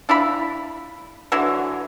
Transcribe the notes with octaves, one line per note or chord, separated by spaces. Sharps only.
D4 E4 F4 B5
D3 E3 F#3